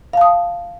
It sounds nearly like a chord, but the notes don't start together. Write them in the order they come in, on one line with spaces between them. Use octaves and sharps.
F5 A5 D#6